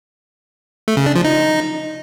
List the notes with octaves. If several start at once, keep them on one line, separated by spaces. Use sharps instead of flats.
A3
C#3
D4
F3
D#4